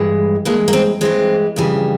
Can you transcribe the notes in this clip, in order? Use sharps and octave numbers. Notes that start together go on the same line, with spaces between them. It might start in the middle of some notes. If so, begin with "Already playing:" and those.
Already playing: G2 E3 G#3
G2 E3 G#3 A#3
A#3
C4
G2 E3 G#3 C4
F2 C#3 E3 G3